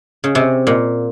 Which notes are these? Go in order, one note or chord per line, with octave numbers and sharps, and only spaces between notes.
C#3
C3
A#2